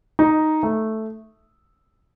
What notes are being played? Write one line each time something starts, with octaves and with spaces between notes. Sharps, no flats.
D#4
A3